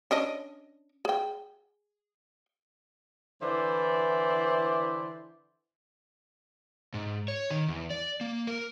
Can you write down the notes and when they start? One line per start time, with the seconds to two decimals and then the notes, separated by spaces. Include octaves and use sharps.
0.11 C#4 D4 D#5
1.05 G#4 G5
3.42 D3 E3 E4 B4 C5 D5
6.94 G#2
7.28 C#5
7.50 D#3
7.68 E2
7.90 D5
8.21 A#3
8.47 A#4